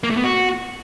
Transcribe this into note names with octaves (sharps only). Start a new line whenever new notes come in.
A#3
A3
B3
F#4